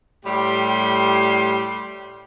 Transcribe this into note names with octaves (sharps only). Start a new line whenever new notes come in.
A2 G3 G4 C6